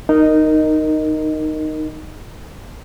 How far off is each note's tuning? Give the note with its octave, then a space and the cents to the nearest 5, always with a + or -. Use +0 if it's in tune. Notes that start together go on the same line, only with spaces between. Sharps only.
D#4 -10 A#4 +0 D#5 +0